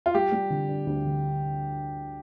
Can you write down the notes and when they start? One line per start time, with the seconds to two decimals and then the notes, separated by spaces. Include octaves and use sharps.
0.06 F4
0.14 G3 G4
0.32 G3
0.50 D3
0.69 D4
0.87 D2
1.05 D3